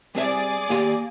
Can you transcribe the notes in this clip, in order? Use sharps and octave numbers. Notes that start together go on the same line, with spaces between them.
G3 C4 G#4 D5 E5
D#2 A#3 G4 C6